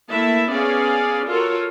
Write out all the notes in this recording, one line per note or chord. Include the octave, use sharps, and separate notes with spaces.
A3 A#3 E4 E5 A5
B3 C#4 G#4 D5 F5
F4 F#4 A4 A#4 C#5